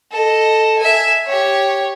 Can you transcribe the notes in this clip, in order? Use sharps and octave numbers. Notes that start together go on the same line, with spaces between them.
A4 D#5
E5 G#5
G4 C#5